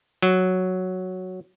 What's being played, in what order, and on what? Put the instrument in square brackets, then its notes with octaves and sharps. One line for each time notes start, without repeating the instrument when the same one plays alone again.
[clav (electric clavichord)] F#3